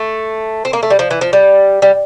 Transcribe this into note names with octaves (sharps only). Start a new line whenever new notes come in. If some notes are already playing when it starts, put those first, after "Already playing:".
Already playing: A3
C4
A#3
A3
G3
F3
E3
F3
G3
G3